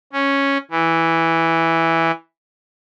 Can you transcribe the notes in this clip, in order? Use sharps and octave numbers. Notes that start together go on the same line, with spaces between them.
C#4
E3